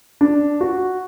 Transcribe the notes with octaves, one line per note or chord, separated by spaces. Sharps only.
D4
F#4